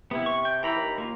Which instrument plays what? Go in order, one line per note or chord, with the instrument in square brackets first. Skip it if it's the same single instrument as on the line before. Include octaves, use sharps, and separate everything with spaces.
[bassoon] C3 [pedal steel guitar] B3 E4
[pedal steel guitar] C#6
G5
[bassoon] E3 [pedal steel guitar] G5 A#5 B5
[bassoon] D#2
[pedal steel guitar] A#3 F4